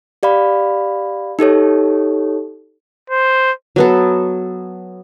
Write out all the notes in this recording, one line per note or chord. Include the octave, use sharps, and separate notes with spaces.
G4 D5 F5 B5
D#4 G4 A4 C#5
C5
F#3 B3 A4